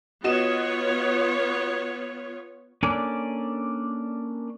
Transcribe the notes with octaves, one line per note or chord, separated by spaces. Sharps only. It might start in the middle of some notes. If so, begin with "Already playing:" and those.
B3 F4 F#4 C#5 D#5 E7
A#3 C#4 D4 A4 D5 G#5